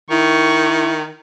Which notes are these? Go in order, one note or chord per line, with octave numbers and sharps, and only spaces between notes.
D#3 E4 C#6